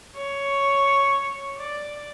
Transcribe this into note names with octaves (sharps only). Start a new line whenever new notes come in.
C#5
D5